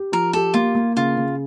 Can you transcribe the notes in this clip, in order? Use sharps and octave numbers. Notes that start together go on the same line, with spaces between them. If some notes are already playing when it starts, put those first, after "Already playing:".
Already playing: G4
F3 A#4
G4 A4
A#3 F4
A#3
C#3 F4
C#3